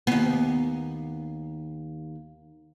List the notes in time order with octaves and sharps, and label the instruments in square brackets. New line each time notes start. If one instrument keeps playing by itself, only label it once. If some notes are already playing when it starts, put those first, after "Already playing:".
[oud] D#2 B3